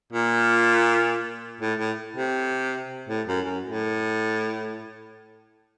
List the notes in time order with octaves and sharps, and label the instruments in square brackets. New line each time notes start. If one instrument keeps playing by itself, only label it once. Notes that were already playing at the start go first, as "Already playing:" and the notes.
[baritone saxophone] A#2
A2
A2
C3
A2
F#2
F#2
A2